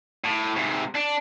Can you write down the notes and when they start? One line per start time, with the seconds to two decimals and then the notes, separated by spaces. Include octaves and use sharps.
0.24 A2
0.56 G#2 C3
0.95 D4